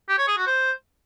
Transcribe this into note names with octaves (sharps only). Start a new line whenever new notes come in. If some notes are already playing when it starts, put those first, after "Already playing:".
G4
C#5
G#4
F#4
C5